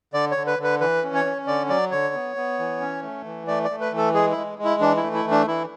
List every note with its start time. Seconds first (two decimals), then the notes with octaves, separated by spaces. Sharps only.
0.14 D3 D5
0.31 C#5
0.37 D3
0.47 B4
0.59 D3 B4
0.80 E3 B4
1.03 C#4
1.14 C#5
1.25 C#4
1.47 D3 D5
1.69 F#3 D5
1.92 D3 C#5
2.14 B3
2.36 B3
2.59 E3
2.81 C#4
3.03 A3
3.25 E3
3.47 A3 D5
3.64 D5
3.70 A3
3.81 B4
3.92 E3
3.97 A4
4.14 G#3 G#4
4.31 E4
4.37 G#3
4.58 G#3
4.64 E4
4.81 E3 D4
4.97 E4
5.03 A3
5.14 E4
5.25 E3
5.31 D4
5.47 E3 E4